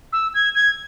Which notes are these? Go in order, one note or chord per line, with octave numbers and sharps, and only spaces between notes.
E6
G#6
G#6